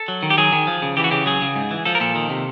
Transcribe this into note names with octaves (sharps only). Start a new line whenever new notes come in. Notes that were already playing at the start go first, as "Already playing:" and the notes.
Already playing: A4
F#3
D#3
G4
F#3 G#4
D#3
F3
C#3
E3 G4
F#4
C#3 G4
F#3 G#4
C#3
G#2
E3
F3 A4
A#4
A#2 A4
D#3
C3